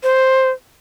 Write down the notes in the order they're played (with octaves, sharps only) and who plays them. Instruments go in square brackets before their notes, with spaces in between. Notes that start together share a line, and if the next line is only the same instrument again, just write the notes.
[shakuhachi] C5